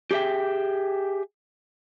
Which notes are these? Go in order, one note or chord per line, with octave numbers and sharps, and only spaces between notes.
G4 G#4 D5 E5 G5